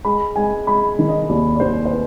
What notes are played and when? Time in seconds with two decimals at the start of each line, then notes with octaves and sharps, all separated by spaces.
0.05 G#3 B5
0.36 G#3 G#5
0.67 G#3 B5
0.99 D#3
1.09 D#5
1.29 D#2 D5
1.56 D5
1.60 D#2 C5
1.85 C5
1.91 B4